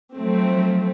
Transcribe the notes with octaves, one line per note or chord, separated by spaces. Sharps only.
F3 F#3 A3 C4